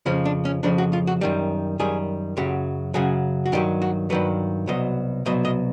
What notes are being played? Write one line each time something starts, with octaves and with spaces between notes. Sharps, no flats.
F2 C#3 F3 C#4
D4
C#4
F2 C#3 F3 D4
F#4
F4
F#4
F#2 D#3 G3
F#2 D#3 G3 G#4
F#2 C#3 F#3 G4
F#2 C#3 F#3 G#4
F#4
G2 D#3 F#3 G4
F#4
G2 D#3 F#3 B4
C2 B2 F#3 D#5
C2 B2 F#3 D#5
D#5